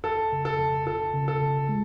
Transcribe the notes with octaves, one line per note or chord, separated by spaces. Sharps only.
F2 A4
C#3
A4
F2
F4 A4
C#3
A4
C#3
G#3